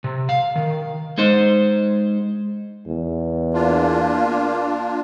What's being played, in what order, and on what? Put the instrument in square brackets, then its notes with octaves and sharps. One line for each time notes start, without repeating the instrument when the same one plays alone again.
[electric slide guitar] C3
F5
D#3
[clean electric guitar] G#3 D#4 C5
[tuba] E2
[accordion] A#3 D4 F4